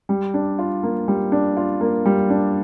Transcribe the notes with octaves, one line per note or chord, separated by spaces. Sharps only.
G3
D4
F4
A#3
G3
D4
F4
A#3
G3
D4